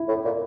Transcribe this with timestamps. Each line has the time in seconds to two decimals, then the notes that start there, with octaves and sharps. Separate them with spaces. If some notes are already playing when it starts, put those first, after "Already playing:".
Already playing: E4
0.08 A2
0.25 A#2